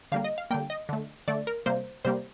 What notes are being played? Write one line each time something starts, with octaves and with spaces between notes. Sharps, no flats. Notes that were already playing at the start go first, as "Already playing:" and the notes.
D3 G3 A#3 F5
D#5
F5
D3 G3 A#3 G5
D#5
D3 A3
D3 A3 D5
A#4
C3 G3 A#3 C5
C3 G3 A#3 C5